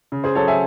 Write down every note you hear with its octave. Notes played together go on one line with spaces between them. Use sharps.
C#3
G#4 C5
F#3 A4 C#5
E5 G#5